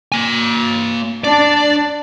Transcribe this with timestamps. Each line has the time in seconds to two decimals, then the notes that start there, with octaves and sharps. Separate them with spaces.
0.12 A#3 G#5
1.24 D4 D5